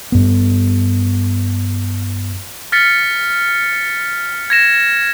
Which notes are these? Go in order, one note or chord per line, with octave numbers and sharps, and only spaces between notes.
G2 B3
F6 A6 B6 C#7
G#6 A#6 E7